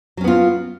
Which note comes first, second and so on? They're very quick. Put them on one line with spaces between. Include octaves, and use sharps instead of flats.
F#3 C#4 B3 F4